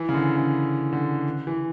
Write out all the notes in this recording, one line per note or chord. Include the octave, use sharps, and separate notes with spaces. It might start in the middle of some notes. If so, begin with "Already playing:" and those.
Already playing: E3
C#3
D3
C#3
D3
E3